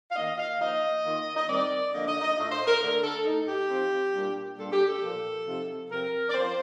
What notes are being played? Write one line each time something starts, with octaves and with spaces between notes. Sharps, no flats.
F5
D#3 A#3 D#4 D#5
F5
F3 A#3 D#4 D#5
D#3 A#3 F4
D#5
D#3 G3 C4 D5
D3 F3 A#3 D4 D#5
D#5
D#5
A2 A3 D4 F4 D#5
C5
A#4
D3 A3 D4 A#4
A4
A2 A3 D#4
G4
F3 C4 D#4
A#2 G3 D4 F4
A#2 G3 D4 F4 A4
G4
A4
A#2 F3 A#3
C3 F3 C4 D#4
C3 F3 C4 A#4
D5
F3 C4 F4 C5